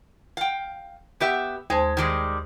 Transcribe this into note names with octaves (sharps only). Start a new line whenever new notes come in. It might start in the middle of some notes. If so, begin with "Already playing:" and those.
F5 G5
B3 G4 E5
D#2 G#3 C5 A5
D#3 G3 G#3